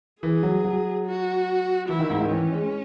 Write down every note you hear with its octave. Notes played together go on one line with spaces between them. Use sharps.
E3 G#4
F#3
F#3
F#4
E3 E4
D#3
G#2
D#3
E3 C#4
G#3